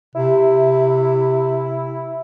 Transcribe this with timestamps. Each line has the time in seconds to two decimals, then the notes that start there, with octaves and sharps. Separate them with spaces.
0.15 C3 E4